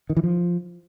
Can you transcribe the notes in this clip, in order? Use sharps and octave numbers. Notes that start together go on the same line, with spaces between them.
D#3
E3
F3